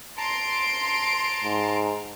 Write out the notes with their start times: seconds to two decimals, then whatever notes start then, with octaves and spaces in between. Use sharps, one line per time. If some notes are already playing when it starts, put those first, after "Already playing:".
0.17 A5 A#5 C6 D7
1.44 G#2